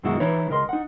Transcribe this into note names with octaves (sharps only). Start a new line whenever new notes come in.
F#2 B2 D#3 G#3 E4 F#4
E3 D#4 E4 B4 C#5
C#2 A#4 D#5 C6
D#4 F#5